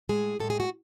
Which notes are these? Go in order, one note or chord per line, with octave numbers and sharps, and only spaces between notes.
A2 G#3 G#4
A2 G#3 A4
G#4
F#4